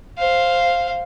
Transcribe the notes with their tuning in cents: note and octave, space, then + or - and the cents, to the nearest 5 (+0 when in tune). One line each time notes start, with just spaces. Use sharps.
C5 +5 F5 +0